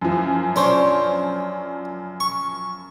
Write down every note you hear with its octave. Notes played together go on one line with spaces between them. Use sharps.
F#2 F3
D4 C5 C#5
C#6